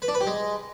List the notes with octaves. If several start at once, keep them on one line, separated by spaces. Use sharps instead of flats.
B4
D4
B4
G4
G#3